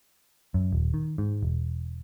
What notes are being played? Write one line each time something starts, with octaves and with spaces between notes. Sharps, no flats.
F#2
D#1
D#3
G#2
E1